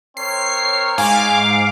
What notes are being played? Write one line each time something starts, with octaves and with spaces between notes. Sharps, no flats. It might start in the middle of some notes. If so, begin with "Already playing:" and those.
C4 A#4 C#5 C7
G#2 F5 G#5 D6